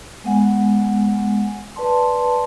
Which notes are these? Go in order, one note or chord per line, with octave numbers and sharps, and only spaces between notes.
G#3 B3 F#5 G#5
B4 D5 A5 C6